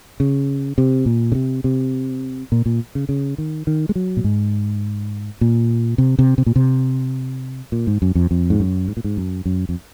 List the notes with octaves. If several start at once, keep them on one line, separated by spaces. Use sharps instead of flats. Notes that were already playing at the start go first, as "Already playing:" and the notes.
C#3
C3
A#2
C#3
C3
C3
A#2
A#2
C#3
C#3
D#3
D#3
G#3
F#3
A#2
G#2
A#2
C3
C3
C3
A#2
C3
A#2
G#2
F#2
F2
F2
G#2
F#2
G#2
A#2
G#2
F#2
F#2
F2